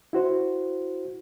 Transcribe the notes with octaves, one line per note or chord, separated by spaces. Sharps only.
E4 F#4 C5